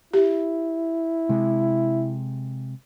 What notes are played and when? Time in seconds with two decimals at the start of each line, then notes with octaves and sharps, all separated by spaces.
0.13 E4 G4
1.29 C3 G#3